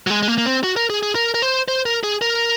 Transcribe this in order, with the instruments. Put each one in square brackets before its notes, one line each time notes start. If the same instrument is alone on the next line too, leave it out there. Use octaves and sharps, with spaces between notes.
[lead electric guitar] F#3
G#3
G#3
A#3
A#3
C4
F#4
A#4
G#4
G#4
A#4
A#4
C5
C5
A#4
G#4
A#4